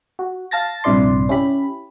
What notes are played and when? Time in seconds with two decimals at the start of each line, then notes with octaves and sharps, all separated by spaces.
0.19 F#4
0.51 F5 A5 A6 A#6
0.84 A#1 G2 C3 E4 D5 C6
1.29 C#4 E4 G4 B5